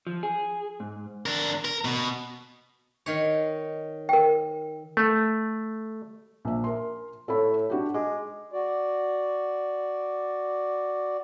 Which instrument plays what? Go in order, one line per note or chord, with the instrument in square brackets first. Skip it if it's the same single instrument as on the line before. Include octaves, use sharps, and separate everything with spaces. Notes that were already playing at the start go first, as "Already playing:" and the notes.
[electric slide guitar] F3
G#4
G#2
[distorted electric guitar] D4 A#4
A#4
B2
[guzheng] D#3 C#5
[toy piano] A#4 G5
[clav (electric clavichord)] A3
[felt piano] A#1 E5
A#4 C6
[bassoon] A2 [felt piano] A4 C#5 B5
[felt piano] D4 F#4 G4
[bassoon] G#3 [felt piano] D6
[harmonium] F#4 D5